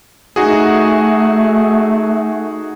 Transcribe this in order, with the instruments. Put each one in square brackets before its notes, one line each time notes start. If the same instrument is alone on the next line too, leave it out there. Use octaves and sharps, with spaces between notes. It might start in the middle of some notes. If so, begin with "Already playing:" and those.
[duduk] A3 [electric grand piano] D#4 F#4 G#4